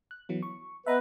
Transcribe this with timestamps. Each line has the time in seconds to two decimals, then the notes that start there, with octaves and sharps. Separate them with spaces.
0.11 F#6
0.29 E3 F#3 B3
0.43 C#6
0.86 B3 B4 D#5 E5 A#5